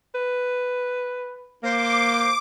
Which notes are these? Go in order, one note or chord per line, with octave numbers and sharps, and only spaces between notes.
B4
A#3 C5 D6